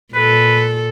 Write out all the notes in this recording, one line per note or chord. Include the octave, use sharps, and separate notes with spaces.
A#2 A4 B4